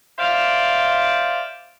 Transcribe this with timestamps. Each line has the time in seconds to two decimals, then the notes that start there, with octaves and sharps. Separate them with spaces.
0.19 C5 D5 E5 F5